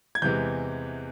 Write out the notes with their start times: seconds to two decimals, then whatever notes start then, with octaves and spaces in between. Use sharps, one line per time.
0.15 G#6
0.22 E2 C3 E3 G#3 G6